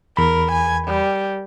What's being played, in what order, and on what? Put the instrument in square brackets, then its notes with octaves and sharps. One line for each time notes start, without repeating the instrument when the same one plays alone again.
[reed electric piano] E2 B5 [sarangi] A#4
[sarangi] G#5
G3